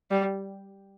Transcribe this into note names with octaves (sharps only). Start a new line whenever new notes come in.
G3